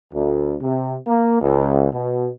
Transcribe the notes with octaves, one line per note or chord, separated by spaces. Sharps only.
D2
C3
A#3
C#2
B2